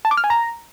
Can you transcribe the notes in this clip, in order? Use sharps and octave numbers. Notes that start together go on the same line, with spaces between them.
A5
D6
F6
G#5
A#5